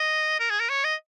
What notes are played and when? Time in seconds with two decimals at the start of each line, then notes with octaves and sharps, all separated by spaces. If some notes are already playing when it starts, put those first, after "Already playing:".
Already playing: D#5
0.40 A#4
0.50 G#4
0.60 A#4
0.69 C#5
0.84 D#5